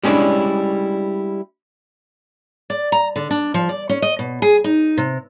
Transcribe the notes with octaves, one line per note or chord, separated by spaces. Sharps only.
G3 G#3 C#4 D4 E4
D5
A#5
D3
D4
F3
D5
C#4
D#5
B2
G#4
D#4
C3